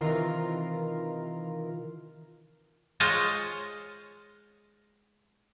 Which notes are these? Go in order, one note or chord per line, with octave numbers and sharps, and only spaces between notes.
C3 D#3 E3 F4 A#4
G#3 F4 C5 C#5 D#5 F5